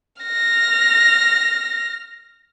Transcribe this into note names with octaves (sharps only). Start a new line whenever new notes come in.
F6 A#6